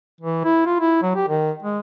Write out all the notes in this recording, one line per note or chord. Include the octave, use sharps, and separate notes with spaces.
E3
E4
F4
E4
F#3
G4
D#3
G#3